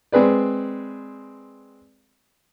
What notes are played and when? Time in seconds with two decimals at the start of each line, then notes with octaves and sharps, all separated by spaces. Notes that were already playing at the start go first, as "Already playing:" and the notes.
0.12 G#3 C4 G#4 B4 D5